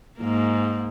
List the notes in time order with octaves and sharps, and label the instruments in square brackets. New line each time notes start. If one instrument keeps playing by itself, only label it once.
[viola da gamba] G#2 A#3